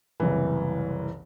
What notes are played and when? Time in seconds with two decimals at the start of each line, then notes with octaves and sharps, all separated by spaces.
0.20 F#1 C2 E3